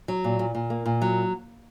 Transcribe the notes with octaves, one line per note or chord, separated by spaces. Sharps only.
F#3
A#2
A#2
A#2
A#3
A#2
F#3